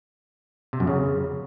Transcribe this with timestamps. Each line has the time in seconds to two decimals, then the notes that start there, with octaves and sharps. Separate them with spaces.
0.73 C3
0.80 F#2
0.87 C#3